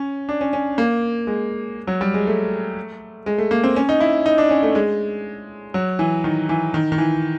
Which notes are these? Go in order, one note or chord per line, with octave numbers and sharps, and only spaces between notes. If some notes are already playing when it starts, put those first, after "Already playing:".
Already playing: C#4
D4
C#4
C#4
A#3
G#3
F#3
G3
G#3
A3
G#3
A3
A#3
C4
C#4
D#4
E4
D#4
D4
C#4
A3
G#3
F#3
E3
D#3
E3
D#3
D#3
E3